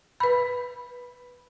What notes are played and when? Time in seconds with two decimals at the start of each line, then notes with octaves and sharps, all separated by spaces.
0.20 B4 B5